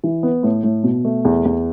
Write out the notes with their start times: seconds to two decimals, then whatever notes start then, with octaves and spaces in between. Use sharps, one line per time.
0.04 E3
0.23 B3
0.43 A2
0.63 A2
0.84 B2
1.05 A3
1.25 E2
1.45 E2